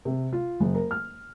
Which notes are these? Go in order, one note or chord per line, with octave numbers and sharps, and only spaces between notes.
C3
F4
F#1
A#4
F6